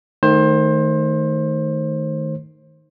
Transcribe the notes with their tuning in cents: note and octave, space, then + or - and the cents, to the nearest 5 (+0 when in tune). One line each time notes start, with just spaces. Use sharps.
D#3 +0 A3 +0 C5 +25